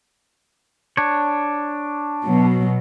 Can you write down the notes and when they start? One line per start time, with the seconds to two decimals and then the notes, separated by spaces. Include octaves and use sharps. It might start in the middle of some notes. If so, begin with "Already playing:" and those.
0.97 D4 C#5
2.24 B2 F#3